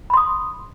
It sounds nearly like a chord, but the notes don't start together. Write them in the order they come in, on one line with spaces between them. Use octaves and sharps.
B5 C6 D#6